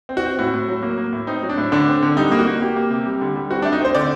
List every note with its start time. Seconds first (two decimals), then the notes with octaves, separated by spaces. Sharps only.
0.09 C4
0.17 F#4
0.24 C4
0.39 A2 F#4
0.54 A2
0.68 F#3
0.83 A#3
0.98 A#3
1.13 A2
1.27 C4 D#4
1.43 F#3
1.49 D4
1.58 A2
1.72 D3 D4
1.88 C4
2.02 D3
2.17 G3 D#4
2.32 A#3
2.39 F#4
2.47 A#3
2.61 A#3 G4
2.76 A#3
2.91 C3
3.06 G3
3.22 D3
3.36 G3
3.51 C4 F#4
3.62 A3 D4
3.72 D#4
3.81 C4 C5
3.95 D3 D5